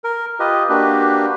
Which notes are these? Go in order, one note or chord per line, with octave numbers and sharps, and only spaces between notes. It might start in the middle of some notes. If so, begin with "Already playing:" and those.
A#4
F4 G4 B4 D#5
A#3 D4 F#4 G4 B4